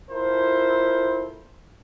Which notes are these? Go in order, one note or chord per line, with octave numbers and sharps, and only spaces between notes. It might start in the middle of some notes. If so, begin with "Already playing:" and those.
E4 F4 A4 A#4 C5